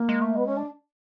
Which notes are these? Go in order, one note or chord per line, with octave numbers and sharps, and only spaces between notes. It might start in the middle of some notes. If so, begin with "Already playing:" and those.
Already playing: A#3
G#3
A3
G#3 B3
C#4
D4